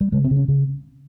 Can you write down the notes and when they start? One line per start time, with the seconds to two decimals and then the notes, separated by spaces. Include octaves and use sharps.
0.01 G3
0.12 C#3 G#3
0.24 C4
0.31 C#3
0.37 C#4
0.48 C#3